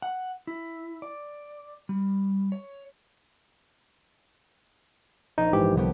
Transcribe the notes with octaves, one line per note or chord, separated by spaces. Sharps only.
F#5
E4
D5
G3
C#5
A#1 D#4
G#2 E3 G4
C2 D3 B3 G4